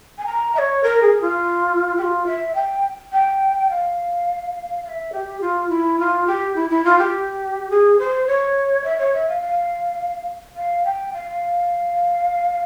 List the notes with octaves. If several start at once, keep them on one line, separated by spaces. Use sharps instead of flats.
G#5
A#5
E5
C#5
A#4
G#4
F4
G4
F4
E5
G5
G5
F5
F5
E5
G4
F4
E4
F4
G4
E4
E4
F4
G4
G#4
C5
C#5
E5
C#5
E5
F5
F5
F5
G5
F5